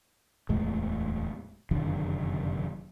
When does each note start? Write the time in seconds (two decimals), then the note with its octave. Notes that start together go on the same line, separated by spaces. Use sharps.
0.49 D1 E2 G#3 A3
1.71 F1 F#2 D3 D#3